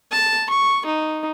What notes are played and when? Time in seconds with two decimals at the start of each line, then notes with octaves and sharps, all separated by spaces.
0.11 A5
0.50 C#6
0.85 D#4